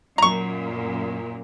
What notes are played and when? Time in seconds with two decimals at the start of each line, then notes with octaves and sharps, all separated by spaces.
0.18 F#2 A#2 A#5 C#6